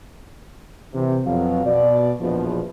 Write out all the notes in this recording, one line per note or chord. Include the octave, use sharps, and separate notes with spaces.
C3 E3
F2 B2 F#3 F5
B2 D5
A#1 E2 B2 F3